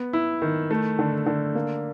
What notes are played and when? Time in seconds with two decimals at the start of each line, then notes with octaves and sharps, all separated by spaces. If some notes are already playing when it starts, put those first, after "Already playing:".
Already playing: B3
0.13 E4
0.42 D#3
0.71 A3
0.99 D3
1.26 D3
1.55 A#3